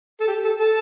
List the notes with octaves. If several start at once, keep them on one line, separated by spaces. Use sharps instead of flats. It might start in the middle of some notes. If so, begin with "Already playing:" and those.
A4
G4
A4
A4